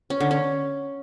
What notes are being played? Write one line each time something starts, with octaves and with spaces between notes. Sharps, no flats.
C#4
D3
C#4